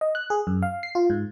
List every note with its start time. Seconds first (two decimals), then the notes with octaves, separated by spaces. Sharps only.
0.01 D#5
0.15 F#6
0.30 G#4
0.47 F#2
0.62 F5
0.83 C7
0.95 F4
1.10 G#2